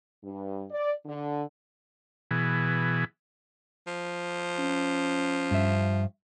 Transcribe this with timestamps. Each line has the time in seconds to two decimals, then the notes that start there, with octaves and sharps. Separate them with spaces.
0.23 G2
0.71 D5
1.05 D3
2.31 B2 E3 G#4
3.87 F3
4.59 C#4
5.51 G2 E5